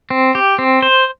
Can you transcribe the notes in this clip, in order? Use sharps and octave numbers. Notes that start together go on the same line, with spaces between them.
C4
G4
C4
C5